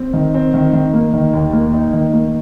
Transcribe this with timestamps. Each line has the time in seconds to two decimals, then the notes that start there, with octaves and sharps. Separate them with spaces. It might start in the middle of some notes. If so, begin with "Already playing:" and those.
Already playing: C4
0.13 D#3
0.34 C4
0.54 D#3
0.73 D#3
0.94 A#3
1.13 D#3
1.33 D#2
1.53 A#3
1.74 D#4
1.93 D#3
2.13 A#3